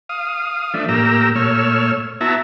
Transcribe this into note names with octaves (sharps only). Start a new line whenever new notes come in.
F5 D#6
F3 A3 D4 E5
A2 A#3 G4 A#5 E6
A#2 A3 C#5 E6 F6
B3 E4 F#4 E5 A5 A#5